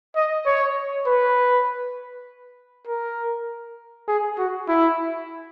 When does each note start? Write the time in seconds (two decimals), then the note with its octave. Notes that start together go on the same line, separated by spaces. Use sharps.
0.16 D#5
0.46 C#5
1.06 B4
2.87 A#4
4.08 G#4
4.38 F#4
4.68 E4